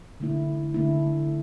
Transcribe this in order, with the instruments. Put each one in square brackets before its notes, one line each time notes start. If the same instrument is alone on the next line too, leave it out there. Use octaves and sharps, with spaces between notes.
[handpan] D3 A3 E4
D3 A3 E4